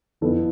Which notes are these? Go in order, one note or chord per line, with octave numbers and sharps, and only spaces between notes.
G1 F2 E3 B3 A4